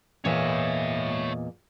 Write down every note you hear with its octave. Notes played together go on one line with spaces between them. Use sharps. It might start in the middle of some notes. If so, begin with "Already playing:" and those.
E2 A#2 C#5 D#5 E5